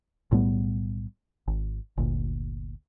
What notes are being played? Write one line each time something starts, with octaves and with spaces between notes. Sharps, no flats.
B1 A2 G3 B3
G#1
G1 D2 A#2